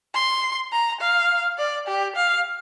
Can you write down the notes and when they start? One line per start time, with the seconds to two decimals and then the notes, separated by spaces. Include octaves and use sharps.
0.14 C6
0.73 A#5
1.01 F5
1.58 D5
1.87 G4
2.16 F5